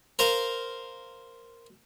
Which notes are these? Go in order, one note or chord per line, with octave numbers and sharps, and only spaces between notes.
A#4 C5 F5